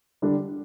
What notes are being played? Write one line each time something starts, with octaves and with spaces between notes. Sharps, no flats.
D3 G3 D4